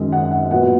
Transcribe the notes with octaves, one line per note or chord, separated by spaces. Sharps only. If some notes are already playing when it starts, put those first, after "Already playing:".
Already playing: F#2 D#3 G#3 D#5
F#5
F#5
A#2 F#3 B3 F#5